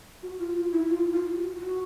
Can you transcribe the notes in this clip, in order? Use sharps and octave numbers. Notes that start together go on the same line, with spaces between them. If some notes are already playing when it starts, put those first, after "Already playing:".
F#4
F4
F4
E4
F4
F4
F#4
F#4